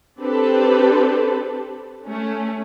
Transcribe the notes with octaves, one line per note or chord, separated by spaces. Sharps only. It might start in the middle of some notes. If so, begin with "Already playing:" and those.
C4 D4 G4 A4 B4
A3 C#4